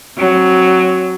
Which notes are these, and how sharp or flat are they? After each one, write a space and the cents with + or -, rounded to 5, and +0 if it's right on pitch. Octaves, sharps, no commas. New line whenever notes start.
F#3 +5 C4 +30